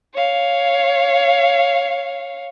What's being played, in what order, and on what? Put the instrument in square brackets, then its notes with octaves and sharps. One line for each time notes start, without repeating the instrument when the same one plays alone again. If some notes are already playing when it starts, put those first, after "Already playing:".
[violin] C#5 F5